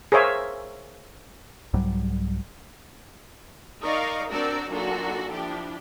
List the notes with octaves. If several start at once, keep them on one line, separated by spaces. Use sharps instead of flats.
G#4 A#4 C5 C#5 E5 F5
C2 G#2 F#3 G3
D#4 A#4 D5 D#5 F5 C#6
C4 D4 F#4 A#4 D5 E6
A#2 F#3 D4 D#4 F#4 A4
F3 D4 E4 G4